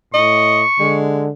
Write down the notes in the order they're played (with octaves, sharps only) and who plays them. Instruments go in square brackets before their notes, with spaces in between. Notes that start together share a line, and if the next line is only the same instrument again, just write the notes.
[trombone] A2 [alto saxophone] D#5 [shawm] C#6
[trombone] D3 [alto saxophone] G#3